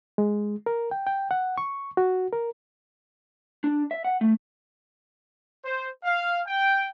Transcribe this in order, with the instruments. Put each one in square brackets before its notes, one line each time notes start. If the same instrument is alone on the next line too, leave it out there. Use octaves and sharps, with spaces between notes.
[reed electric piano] G#3
A#4
G5
G5
F#5
C#6
F#4
A#4
[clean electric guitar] D4
E5
F#5
A3
[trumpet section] C5
F5
G5